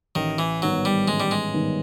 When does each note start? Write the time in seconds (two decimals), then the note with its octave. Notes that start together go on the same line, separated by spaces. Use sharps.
0.15 A1 D#3
0.38 E3
0.62 G#2 D#3 F#3 G3 B3
0.85 G3
1.08 A1 G#3
1.20 G3
1.31 G#3
1.54 G#2 D#3 G3 B3